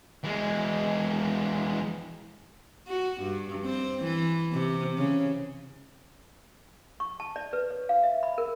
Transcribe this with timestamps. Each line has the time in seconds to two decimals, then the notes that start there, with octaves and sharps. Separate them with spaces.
0.24 E3 G#3
2.88 F#4
3.22 G2
3.65 C4
4.03 E3
4.53 C3
4.98 C#3
7.00 C#6
7.20 A5
7.36 D5
7.53 B4
7.71 C#5
7.89 F5
8.03 E5
8.23 B5
8.38 A#4